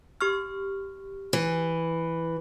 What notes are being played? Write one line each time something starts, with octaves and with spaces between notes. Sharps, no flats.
G4 C#6 F6
E3